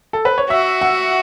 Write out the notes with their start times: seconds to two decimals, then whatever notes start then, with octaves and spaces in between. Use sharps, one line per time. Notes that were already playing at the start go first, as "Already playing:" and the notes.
0.13 A4
0.25 B4
0.38 C#5
0.50 F#4 E5
0.82 F#5